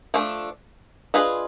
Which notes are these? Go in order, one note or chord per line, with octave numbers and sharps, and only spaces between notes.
F3 A3 D4
D4 F4 G#4 B4 D#5